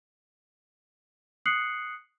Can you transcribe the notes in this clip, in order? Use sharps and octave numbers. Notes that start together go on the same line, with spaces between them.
D#6 F#6 C7 C#7 F#7